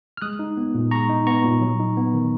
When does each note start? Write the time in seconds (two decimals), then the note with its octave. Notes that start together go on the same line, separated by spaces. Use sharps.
0.17 F6
0.22 G#3 D#6 F#6
0.39 D#4
0.57 B3
0.75 A#2
0.91 G#3 A#5 C#6
1.09 D#4
1.27 B3 A#5 C#6
1.45 A#2
1.62 F#3
1.80 D#4
1.97 B3
2.14 D#3